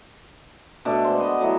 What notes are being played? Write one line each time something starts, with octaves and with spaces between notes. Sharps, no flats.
B2 A3 D4
G#3 C5
B3 D#5
E3 F#3 A3